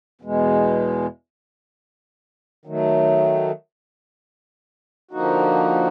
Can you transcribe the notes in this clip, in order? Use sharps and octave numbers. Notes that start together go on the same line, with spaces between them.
E2 B2 G#3
D#3 F#3 A3
D3 F3 A#3 D#4 F#4